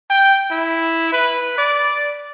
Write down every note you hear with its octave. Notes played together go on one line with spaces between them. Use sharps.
G5
E4
B4
D5